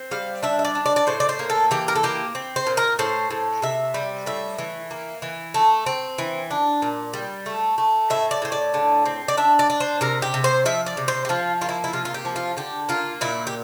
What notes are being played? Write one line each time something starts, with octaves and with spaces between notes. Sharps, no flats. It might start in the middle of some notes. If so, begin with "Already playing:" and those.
Already playing: C4
G3 F5
D4 E5
E5
D5
D4
D5
D5
A2 C5
D5
C5
A#3
A4
E3 G4
A#4
A4
A#3 G4
C4
C5
A#2
A#4
A2 C5
A2
C3 E5
G3
A2 E5
E3
A#3
E3
A3
C4
E3
D4
A#2
G3
A3
A3
A2 E5
D5
A2 C5
D5
D3
C4
D5
D4 E5
D5
D4
C5
C3 A#4
G4
C3
C5
F3 E5
D5
C3
C5
G4
F3 F4
A#3 F4
E4
E4
C3 F4
F4
G4
F3
F4
D3 G4
A#3 F4
A#2 E4
G4